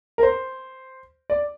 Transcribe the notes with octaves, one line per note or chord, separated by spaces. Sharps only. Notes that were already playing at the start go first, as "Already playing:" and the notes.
A#4
C5
D5